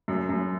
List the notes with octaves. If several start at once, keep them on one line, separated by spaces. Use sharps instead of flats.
F#2
F#2